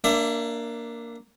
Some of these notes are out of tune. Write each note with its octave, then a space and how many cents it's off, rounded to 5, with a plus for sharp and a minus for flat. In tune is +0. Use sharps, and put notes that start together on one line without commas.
A#3 +0 D4 +0 E5 +30